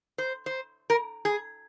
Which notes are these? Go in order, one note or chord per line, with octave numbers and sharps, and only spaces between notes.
C5
C5
A#4
G#4